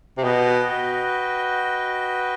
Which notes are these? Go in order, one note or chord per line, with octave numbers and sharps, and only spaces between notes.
C3
B2 F#4 B4 D#5 G5